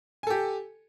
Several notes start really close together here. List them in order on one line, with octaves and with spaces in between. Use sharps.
G#5 A4 G4